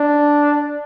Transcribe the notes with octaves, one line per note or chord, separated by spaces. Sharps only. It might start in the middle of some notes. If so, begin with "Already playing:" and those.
Already playing: D4